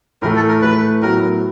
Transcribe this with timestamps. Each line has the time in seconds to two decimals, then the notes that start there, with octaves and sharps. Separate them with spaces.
0.22 A2 E3 A3 A#4
0.36 A4
0.48 A#4
0.62 A2 E3 A3 B4
1.02 A2 F#3 B3 A#4